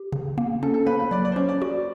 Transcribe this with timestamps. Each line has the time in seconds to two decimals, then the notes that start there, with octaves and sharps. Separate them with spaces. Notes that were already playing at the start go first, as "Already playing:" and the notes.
Already playing: G4
0.12 C#3
0.38 A#3
0.63 C#4 A4
0.74 A4
0.86 A#3 B4
0.99 B4
1.11 F#3 D5
1.25 D5
1.32 C5
1.36 C#4 C#5
1.49 D5
1.62 F#4